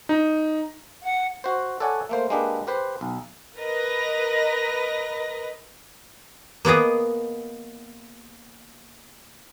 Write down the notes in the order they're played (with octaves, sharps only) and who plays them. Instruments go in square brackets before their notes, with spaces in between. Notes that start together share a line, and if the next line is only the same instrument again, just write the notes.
[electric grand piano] D#4
[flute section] F#5
[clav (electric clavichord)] F#4 C5
A4 C#5 D5 F#5 G#5
A3 A#3 C5
G#3 A#3 D4 G4 B4
G4 B4 C5
B1
[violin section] A#4 B4 D#5 A#6
[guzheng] A#3 B3 G#4 D#5